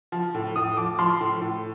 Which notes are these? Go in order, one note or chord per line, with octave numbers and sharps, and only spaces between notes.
F3
A2
A2 D#6
F3 D6
F3 C6
A2
A2